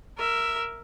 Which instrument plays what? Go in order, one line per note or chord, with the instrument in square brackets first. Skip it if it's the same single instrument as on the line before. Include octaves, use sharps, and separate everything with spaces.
[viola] A#4 E5